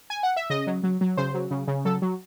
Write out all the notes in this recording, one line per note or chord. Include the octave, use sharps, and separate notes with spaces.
G#5
F#5
E5
C#3 D#5
F#3
F#3
F#3
C#3 C5
F#3
C#3
C#3
F#3 A4
F#3